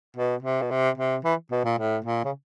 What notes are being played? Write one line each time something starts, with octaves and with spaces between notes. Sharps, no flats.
B2
C3
B2
C3
C3
E3
B2
A#2
A2
A#2
C#3